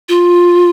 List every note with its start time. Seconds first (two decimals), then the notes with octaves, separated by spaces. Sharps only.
0.09 F4